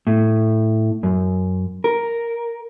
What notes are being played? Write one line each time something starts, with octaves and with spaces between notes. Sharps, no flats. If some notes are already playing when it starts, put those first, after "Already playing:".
A2
F#2
A#4